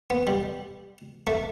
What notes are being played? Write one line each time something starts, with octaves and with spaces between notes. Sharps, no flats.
B3
G3
A3